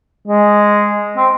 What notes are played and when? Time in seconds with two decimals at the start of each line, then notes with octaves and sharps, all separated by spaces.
0.28 G#3
1.17 C4